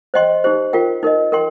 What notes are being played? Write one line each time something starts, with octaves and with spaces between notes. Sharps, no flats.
C5 D#5 G5 C6
D#4 G4 C5
F4 A#4 G5
D#4 A#4 D#5
A#4 G5 C6